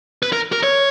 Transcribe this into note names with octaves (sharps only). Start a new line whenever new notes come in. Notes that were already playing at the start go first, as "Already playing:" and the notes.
B4
A#4
A#4
C#5